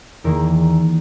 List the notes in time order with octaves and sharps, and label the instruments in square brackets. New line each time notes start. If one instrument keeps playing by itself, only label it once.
[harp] E2 D#3 A#3 A#4